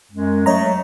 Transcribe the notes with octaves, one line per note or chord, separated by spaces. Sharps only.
F#2 G#3
F#3 A3 C#5 D#5 A#5